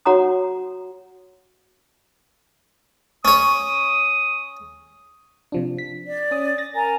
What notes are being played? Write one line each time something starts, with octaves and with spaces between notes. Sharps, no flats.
F#4 C#5 F#5 A#5 D#6
C#4 C#5 D#6
C3 F3 D4
B6
D5
C#4 D#6
A6 A#6
A#4 G#5 A#5